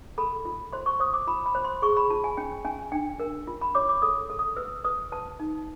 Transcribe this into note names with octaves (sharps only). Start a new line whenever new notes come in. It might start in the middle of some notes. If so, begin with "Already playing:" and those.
A4 B5
F4
C5 C6
C#6
C5 D#6
D6
F4 B5
B5
C5
C6
G#4 C#6
B5
F4 A5
G#5
C#4 G5
C#4 G#5
D4 G5
A#4
F4
B5
C#5 D6
D6
A4 D#6
A4
D#6
B4 E6
B4 D#6
B4 A5
D#4